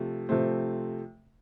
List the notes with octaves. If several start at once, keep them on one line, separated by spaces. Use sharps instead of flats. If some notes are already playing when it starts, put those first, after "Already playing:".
Already playing: C3 F3 A3
C3 F3 A3 C4